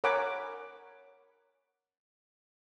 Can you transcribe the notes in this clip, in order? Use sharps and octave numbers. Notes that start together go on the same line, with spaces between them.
A#4 C#5 F#5 G#5 B5 D6